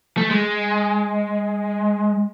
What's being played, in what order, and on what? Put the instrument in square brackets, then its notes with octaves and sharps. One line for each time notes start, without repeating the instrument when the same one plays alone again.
[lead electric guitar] A3
G#3